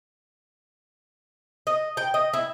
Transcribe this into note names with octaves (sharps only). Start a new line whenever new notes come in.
D#5
G5
D#5
E4